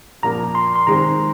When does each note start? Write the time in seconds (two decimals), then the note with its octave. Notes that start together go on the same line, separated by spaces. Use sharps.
0.23 A#2 F3 A#3 A#5
0.55 C6
0.76 C6
0.87 D#3 G#3 C4 A#5